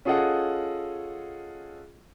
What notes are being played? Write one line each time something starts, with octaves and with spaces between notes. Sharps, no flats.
C#4 F4 G#4 A4 D#5 F#5